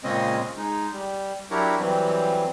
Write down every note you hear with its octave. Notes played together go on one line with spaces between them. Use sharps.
A#2 C#3 G#3 C4 C#4 D#5
G#3 D#4
G3
F#3 D4 E4 G4 A#4 C#5
E3 F#3 G3 C4